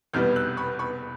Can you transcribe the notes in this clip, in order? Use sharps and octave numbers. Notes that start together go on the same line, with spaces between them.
F1 E2 B2 G3 B3 F6 G6
E6 F#6
B5 C#6
B5 C#6